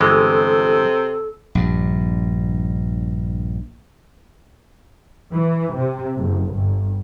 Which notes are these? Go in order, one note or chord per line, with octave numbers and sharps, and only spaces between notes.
G1 C3 E3 G#3 A4
A#1 G2
E3
C3
F#1
G1